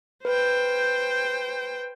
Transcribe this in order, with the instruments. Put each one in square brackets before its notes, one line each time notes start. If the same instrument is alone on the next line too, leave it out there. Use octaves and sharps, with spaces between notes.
[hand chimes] B4 [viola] C5 G5